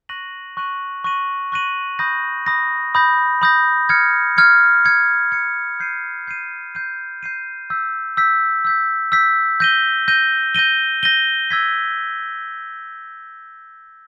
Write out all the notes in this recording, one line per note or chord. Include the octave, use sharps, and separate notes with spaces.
C#6 F#6 A#6 D#7 F#7
C#6 F#6 A#6 D#7 F#7
C#6 F#6 A#6 D#7 F#7
C#6 F#6 A#6 D#7 F#7
B5 D#6 G6 A#6
B5 D#6 G6 A#6
B5 D#6 G6 A#6
B5 D#6 G6 A#6
F6 G#6 C#7
F6 G#6 C#7
F6 G#6 C#7
F6 G#6 C#7
G6 C7 D#7
G6 C7 D#7
G6 C7 D#7
G6 C7 D#7
E6 G6 B6
E6 G6 B6
E6 G6 B6
E6 G6 B6
G6 A#6 D#7 G7
G6 A#6 D#7 G7
G6 A#6 D#7 G7
G6 A#6 D#7 G7
E6 G#6 B6